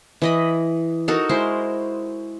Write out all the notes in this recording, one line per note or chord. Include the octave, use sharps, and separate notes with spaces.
E3 D#5 B5
D#4 F#4 A4 A#4
G#3 E4 C5